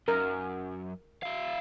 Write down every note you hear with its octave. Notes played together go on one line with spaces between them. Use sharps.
F#2 A#4
E4 F5